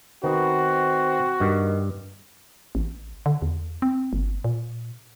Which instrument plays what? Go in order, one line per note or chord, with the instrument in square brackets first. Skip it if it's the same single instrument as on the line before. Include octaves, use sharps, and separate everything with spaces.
[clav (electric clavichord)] D#3 B3 [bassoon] C4 [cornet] F#4
[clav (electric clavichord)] G2 [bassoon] D#3
[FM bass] A1
D3
E2
C4
G1
A#2